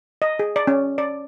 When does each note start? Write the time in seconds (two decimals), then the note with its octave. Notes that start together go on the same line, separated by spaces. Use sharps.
0.22 D#5
0.39 G#4
0.56 D5
0.67 C#4
0.98 D5